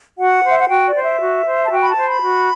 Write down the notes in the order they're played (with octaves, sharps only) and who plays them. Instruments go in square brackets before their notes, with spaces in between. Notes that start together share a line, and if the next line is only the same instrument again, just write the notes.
[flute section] F#4 F#5
C5
E5
F#5
F#4 G5
D5
C5
E5
F#4
C5
A5
F#4 G5
B5
A5
C5
B5
F#4